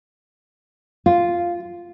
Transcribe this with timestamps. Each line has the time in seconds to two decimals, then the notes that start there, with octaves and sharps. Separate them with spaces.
1.06 F4